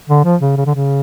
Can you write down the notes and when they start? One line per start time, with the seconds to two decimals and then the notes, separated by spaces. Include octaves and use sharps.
0.09 D3
0.25 F3
0.41 C#3
0.57 C#3
0.66 D3
0.75 C#3